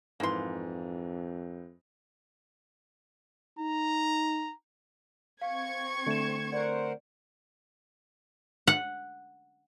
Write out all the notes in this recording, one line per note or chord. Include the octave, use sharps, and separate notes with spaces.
F2 G#2 E3 A#3 C6
D#4 A#5
C4 F5 C#6 G#6
D3 A3 C#7 E7
A#4 C5 D5 F#5
F#5